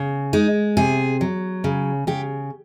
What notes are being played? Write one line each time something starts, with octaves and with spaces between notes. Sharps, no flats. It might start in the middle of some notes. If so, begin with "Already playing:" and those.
Already playing: C#3
G#3 D#4
C3 G#4
F#3
C#3
C#3 G4